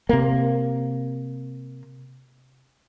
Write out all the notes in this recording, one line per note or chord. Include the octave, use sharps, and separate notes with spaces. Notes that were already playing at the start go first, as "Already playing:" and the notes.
C3 A#3